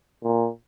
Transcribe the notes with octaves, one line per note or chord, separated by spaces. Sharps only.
A#2